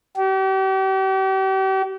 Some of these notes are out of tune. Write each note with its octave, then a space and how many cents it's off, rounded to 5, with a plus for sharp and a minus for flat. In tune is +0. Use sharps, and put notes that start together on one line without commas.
G4 -40